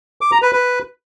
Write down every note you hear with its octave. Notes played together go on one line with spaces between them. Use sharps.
D6
A#5
B4
B4